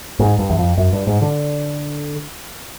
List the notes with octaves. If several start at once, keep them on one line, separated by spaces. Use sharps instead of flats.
G#2
G2
E2
F2
F#2
G2
G#2
D3